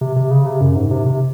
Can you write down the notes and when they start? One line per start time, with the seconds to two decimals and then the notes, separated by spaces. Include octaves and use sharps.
0.01 C3
0.16 C3
0.31 C#3
0.46 C3
0.61 F#2
0.76 G#2
0.91 C3
1.06 C3